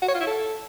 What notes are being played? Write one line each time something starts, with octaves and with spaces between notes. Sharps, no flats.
F#4
C#5
F4
E4
A4